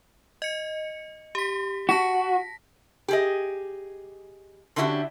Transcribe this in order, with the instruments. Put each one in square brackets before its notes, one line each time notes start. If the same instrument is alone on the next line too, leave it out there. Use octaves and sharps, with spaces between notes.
[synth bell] D#5 C#7
G4 B6
[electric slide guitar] F#4 [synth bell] A5 A#6 B6
[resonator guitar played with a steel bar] G4 G#4 D#5
D3 C#4 D4 E4 F#4 G4